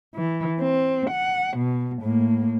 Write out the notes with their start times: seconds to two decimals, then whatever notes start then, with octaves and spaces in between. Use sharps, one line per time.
0.15 E3
0.61 C4
1.10 F#5
1.57 B2
2.03 A2 A#3